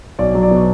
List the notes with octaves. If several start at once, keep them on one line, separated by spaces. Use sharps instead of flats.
B1 D5
F#3
D5
B2